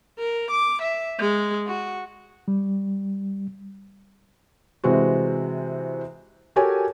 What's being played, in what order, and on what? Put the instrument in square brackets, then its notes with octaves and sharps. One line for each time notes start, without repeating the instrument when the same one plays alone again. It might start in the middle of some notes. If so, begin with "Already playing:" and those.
[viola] A#4
D6
E5
G#3
F#4
[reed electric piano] G3
[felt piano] C3 E3 G#3 C4 F#4
F#4 G4 A4 A#4 C#5 G#5